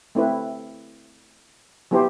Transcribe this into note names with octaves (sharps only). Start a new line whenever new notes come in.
A3 C4 E4 B4
F#3 B3 E4 G4 C5